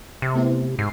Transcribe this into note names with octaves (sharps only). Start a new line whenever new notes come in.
C3
A3 B3 E4
G#2 C7